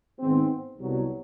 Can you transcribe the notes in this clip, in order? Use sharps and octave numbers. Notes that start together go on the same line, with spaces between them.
G#2 D#3 G#3 B3 C4
C2 B2 F#3